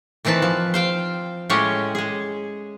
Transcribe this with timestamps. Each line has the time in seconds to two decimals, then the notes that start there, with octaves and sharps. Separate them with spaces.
0.25 D#3 E3 C4 B4 A5
0.42 F3
0.74 C5 F5 G5
1.50 A2 G#3 C#4 G4 G#4 C#5
1.95 G#3 G#4